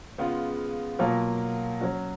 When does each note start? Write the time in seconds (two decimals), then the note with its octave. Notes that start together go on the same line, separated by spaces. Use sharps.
0.18 C#3 G#3 B3 F4
0.99 B2 F#3 A#3 F4
1.81 F#3 C#4 F#4